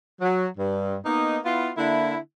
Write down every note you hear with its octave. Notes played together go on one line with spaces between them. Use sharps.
F#3
G2
A#3 B3 D#4
B3 E4 F4
D3 A#3 D4 E4